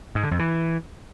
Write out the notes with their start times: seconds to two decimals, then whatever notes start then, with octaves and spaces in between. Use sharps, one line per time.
0.15 G#2
0.23 D3
0.31 F2
0.39 E3